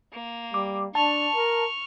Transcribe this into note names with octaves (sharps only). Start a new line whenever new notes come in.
A#3
G3 D6
D4 A5 C#6 F6
A#4